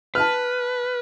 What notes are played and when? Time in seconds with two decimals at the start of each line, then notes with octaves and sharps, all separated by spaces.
0.15 B4 A5 F6